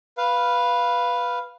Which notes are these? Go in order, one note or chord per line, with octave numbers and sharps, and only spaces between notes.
B4 F5